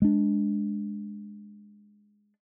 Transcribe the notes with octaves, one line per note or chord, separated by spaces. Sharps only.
G#3 D4